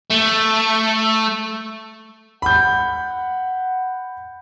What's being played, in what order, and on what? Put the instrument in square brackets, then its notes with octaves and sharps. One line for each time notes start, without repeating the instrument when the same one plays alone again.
[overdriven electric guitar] A3
[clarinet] F#5 [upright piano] B5 G6